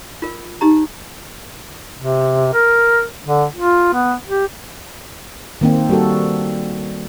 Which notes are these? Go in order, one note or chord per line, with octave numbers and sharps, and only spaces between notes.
F4 A#4
D#4 G4 A#5
C3
A#4
D3
F4
B3
G4
D#3 A#3 C4
G3 F#4 A4